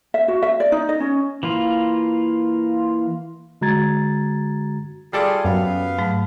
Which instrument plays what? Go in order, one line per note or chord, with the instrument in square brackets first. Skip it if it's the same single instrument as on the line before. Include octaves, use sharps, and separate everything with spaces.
[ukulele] E5
F#4
E5
D5
D#4
D#5
C#4
[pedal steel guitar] E3 A#3 F4
[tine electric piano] D3 G#3 F#4 A#5 G#6 A6
[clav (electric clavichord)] G3 A4 D5 [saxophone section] F4 G#4
[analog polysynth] F#2 [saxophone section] B3 F5
[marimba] G#2 F#3 A3